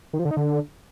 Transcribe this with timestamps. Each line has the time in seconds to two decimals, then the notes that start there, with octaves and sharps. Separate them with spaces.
0.13 D#3
0.19 F3
0.25 D3
0.31 D#4
0.37 D3